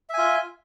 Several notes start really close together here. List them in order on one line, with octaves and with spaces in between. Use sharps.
E5 G#5 F4